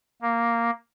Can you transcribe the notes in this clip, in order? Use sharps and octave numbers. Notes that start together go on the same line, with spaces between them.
A#3